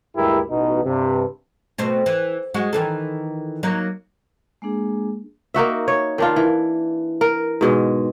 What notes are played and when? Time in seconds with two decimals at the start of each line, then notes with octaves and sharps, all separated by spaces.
0.15 D2 G2 G#3 E4 G4 A#4
0.51 A1 B2 D#4
0.84 G2 C3
1.78 B2 A3 C4
2.06 E3
2.54 G#3 F#4
2.73 D#3 E3 A4
3.63 F#3 A#3 D#4
4.62 G#3 A#3 D4 G#4
5.54 A#3 D#4 F#4 E5
5.88 C#5
6.18 D#3 D4 F4
6.36 E3
7.21 A#4
7.61 G#2 B2 G#3